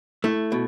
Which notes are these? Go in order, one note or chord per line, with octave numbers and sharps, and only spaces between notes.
A3 E4
B2